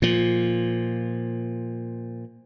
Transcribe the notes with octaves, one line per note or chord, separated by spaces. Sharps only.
A#2 F3